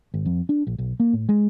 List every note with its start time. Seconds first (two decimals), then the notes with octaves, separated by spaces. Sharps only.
0.14 G#1
0.25 F2
0.49 D4
0.67 A#1
0.79 B1
1.00 A#3
1.13 A2
1.29 G#3